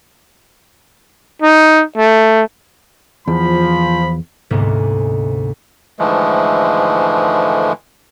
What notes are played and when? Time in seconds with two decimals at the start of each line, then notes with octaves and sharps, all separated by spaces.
1.42 D#4
1.97 A3
3.28 E2 F3 B5
4.50 D2 G#2 C3 G#3 A#3 B3
5.99 G#2 D3 E3 F3 G#3 A3